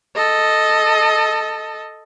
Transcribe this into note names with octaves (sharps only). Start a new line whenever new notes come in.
A4 D#5